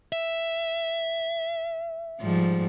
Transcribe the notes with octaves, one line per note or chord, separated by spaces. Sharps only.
E5
G#2 F3 G3